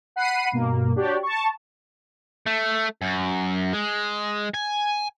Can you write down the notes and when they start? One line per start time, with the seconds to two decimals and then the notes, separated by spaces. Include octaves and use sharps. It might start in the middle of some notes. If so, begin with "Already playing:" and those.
0.16 F#5 B5 C7 D#7
0.52 G2 B2 A#3
0.96 D4 F#4 G4 C#5 D5
1.23 A5 C#6
2.47 A3
3.02 F#2
3.73 G#3
4.54 G#5